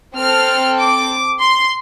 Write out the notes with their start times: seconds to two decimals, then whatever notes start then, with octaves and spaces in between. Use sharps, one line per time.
0.16 C4 A4 F6
0.79 D6
1.42 C6